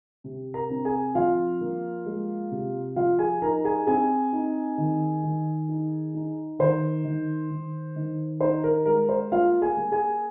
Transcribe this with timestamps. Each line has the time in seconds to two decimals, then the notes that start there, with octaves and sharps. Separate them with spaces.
0.24 C3
0.54 A#4 A#5
0.70 C4
0.85 G#4 G#5
1.15 F3 F4 F5
1.61 A#3
2.06 G#3
2.51 C3
2.96 F3 F4 F5
3.19 G#4 G#5
3.42 D#4 A#4 A#5
3.64 G#4 G#5
3.87 C4 G#4 G#5
4.33 D#4
4.78 D#3
5.23 D#3
5.69 D#4
6.14 D#4
6.59 D#3 C5
7.05 D#3
7.50 D#3
7.96 D#3
8.41 D#4 C5
8.64 A#4
8.86 G#3 A#4
9.09 C5
9.32 A#3 F4 F5
9.62 G#4 G#5
9.77 A#3
9.92 G#4 G#5